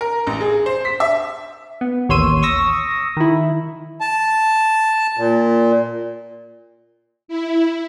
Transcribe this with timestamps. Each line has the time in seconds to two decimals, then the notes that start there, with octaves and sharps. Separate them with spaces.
0.01 A#4
0.27 A1
0.41 G#4
0.66 C5
0.85 B6
1.00 E5
1.81 B3
2.09 A1 D#2 C#5 C6 E6 D#7
2.42 C#6 D#6 E6 A#6
3.16 D#3 E4
4.01 A5
5.18 A#2
7.28 E4